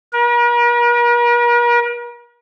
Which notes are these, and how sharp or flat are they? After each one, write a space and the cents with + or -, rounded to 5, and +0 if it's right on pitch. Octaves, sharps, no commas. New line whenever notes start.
A#4 +45